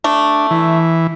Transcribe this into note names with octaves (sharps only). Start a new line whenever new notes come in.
A3 D4
E3